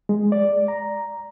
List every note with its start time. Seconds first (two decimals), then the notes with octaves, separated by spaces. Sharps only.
0.09 G#3
0.32 D5
0.68 A#5